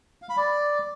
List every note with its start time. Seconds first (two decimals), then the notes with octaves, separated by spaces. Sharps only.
0.22 F5
0.30 B5
0.37 D5